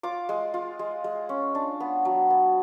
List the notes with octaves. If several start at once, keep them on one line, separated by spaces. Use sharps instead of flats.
F4 D6
G#3
F4
G#3
G#3
C#4
D4
B3
F#3
B3